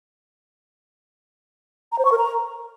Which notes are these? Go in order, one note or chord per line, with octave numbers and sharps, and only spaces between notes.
A#5
C5
C#6
A#4
A#5